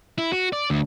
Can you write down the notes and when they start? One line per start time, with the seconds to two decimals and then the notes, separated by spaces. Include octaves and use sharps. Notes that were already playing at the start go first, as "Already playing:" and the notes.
0.18 E4
0.32 F#4
0.52 D5
0.70 D2